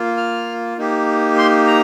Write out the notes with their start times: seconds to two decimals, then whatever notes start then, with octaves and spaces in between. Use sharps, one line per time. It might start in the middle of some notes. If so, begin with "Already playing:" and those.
Already playing: A#3 F4
0.17 F6
0.78 A#3 D#4 G4
1.38 C6
1.67 A#5